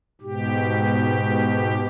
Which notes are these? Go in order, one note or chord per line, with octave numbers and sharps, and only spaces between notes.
G#2 B2 G4